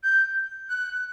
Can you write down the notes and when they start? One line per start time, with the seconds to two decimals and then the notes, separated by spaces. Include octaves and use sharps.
0.04 G6
0.69 F#6